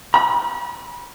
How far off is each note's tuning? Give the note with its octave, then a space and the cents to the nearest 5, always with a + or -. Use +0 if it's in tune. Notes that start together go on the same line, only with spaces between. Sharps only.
B5 -40